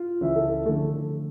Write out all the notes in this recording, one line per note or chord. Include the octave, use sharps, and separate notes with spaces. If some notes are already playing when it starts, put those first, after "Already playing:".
Already playing: F4
C#2 C#3 E3 E5
A4
A4
D3 F3 A3 A4